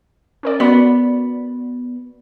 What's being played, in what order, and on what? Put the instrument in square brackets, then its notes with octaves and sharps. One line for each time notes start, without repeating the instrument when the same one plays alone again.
[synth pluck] C#4 A#4 D5
[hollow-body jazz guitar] B3 [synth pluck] F#4 D5 B5